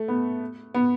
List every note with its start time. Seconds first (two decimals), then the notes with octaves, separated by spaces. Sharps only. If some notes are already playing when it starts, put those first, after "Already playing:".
Already playing: A3
0.08 B3
0.74 B3